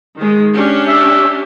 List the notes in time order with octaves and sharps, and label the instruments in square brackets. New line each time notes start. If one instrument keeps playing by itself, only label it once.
[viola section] D#3 G#3
C#4 D4 G4
[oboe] E5